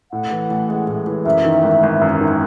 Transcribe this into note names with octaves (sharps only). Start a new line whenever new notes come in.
A2 F#5
E3
A1
G#3
A2
E3
F#2 E5
D#3
G#1
G#1
F#2
D#3